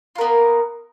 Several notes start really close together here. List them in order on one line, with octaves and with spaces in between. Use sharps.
F4 A#4 B3 A#3